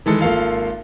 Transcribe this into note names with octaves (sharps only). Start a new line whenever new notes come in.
D#3 E3 G#3 G#4 A4
G#1 A#3 F4 A4 F5